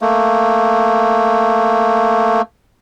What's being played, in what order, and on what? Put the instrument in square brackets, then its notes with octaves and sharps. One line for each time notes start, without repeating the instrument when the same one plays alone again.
[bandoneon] A3 A#3